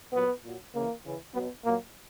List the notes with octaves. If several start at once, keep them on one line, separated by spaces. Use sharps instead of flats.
A#2 F#3 B3
A#2 F#3
C#3 E3 A#3
C#3 E3
B2 F#3 B3
A#2 F#3 A#3